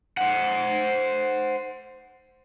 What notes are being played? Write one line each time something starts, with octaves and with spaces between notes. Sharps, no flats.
C5 F#5